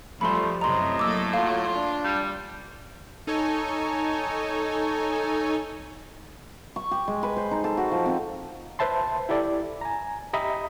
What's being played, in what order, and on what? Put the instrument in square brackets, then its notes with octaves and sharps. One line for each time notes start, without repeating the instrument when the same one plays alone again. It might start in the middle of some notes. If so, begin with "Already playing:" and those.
[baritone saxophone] C3 [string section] F3 G3 [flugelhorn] A3 [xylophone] B5 C6
[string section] F#2 C3 [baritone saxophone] A2 [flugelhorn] D#5 [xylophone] A#5 C6
[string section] F#3 A#3 A4 [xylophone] D6 E6
[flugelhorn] F#3 [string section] F4 [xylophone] F5
[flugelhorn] D4
[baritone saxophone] G3
[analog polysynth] D#4 A4 C#5 G#5
[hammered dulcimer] C#6
G4
G#3
B4
C5
D#4
A4
F#4
F3
C4
[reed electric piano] B4 C5 E5 A5 C6
E4 G4 A4 D5
G#5 A#5
G4 D#5 E5 A#5 B5 D#6